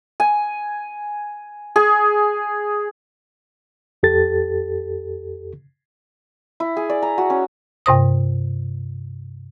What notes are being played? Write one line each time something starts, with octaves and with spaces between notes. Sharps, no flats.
G#5
G#4
F2 G4 A4 A6
E4
G#4
D5
A#5
F#4
C#4
G2 C3 C5 D#6